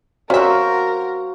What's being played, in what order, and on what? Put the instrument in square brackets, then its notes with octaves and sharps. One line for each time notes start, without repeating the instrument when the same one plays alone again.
[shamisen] C#4 E5 [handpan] F#4 C5 F5 [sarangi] A#4